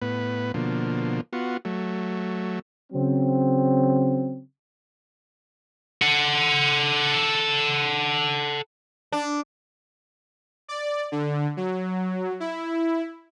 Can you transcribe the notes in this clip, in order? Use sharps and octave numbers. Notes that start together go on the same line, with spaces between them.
A2 B3 B4
B2 D3 F3 A#3
B3 F4 F#4
F#3 A3
C#3 F#3 C4
A4 F#5
D4
D5
D3
F#3
E4